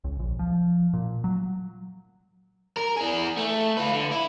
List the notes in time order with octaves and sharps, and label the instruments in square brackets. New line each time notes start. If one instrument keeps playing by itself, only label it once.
[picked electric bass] C#2
A#1
F3
A#2
F#3
[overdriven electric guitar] A#4
E3 G#4
A3
F4 B4
D3
E4